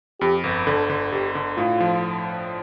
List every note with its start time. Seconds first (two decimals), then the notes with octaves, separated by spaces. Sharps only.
0.21 F2 G4
0.44 G1
0.66 D3 A4
0.90 D3
1.12 G1 G4
1.35 D3
1.57 A2 F4
1.80 F3